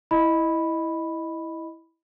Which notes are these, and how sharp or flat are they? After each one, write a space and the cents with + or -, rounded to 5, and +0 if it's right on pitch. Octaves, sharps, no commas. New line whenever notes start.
E4 -10 D#5 +0 B5 +0